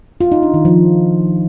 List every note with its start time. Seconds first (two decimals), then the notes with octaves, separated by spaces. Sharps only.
0.21 F4
0.32 D#4
0.43 D4
0.54 D#3
0.65 F3